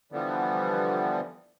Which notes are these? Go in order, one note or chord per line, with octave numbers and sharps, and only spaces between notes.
D3 E3 F3 G3 B3